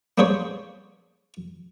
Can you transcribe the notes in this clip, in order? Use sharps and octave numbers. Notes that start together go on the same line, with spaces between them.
A#3 B3 D4 G#4 C5 C#5